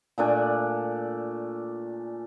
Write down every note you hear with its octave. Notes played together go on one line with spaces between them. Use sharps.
A#2 A3 D4 G#5